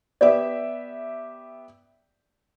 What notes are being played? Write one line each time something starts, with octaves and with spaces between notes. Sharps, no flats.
B3 G4 D5 E5